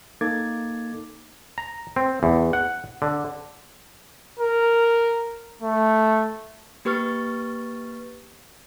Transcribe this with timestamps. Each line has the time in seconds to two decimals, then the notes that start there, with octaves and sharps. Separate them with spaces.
0.21 A#3 D#4 A4 D6 G#6 A6
1.58 A#5
1.96 C4
2.23 E2
2.53 F#5
3.02 D3
4.39 A#4
5.62 A3
6.85 A#3 G4 B4 C#6 F6 A6